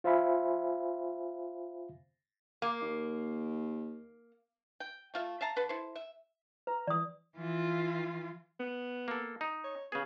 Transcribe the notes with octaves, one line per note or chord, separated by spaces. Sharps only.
F4 C5 E5 F5 G#5 B5
A#3
D#2
G5
A3 F4 E5
E5 F5 A5 A#5
D3 B4 A5
E4 A4 C5
E5
B4 A#5
E3 D5 D#6
E3 F4
B3
A#3 A4
D#4
C#5
C#3 B3 G#4